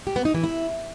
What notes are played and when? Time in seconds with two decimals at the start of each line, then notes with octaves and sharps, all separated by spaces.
0.07 G4
0.16 B3
0.25 D#4
0.34 E3
0.44 E4